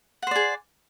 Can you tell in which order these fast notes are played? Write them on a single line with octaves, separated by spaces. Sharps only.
F#5 C5 D5 G#4